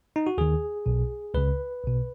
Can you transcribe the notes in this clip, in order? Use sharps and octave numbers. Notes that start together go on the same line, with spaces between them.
D#4
F#4
D#2 D#3 G#4
B1 B2
C#2 C#3 B4
B1 B2